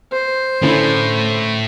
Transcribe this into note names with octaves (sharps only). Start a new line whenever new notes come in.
C5
A2 D3 A3 C#4 E4